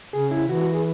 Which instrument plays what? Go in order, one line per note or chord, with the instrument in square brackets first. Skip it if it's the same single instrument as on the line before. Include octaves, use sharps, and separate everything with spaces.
[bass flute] C#3 [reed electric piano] G#4
[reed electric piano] E4
[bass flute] E3 [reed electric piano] F#4
[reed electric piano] F#4
G#4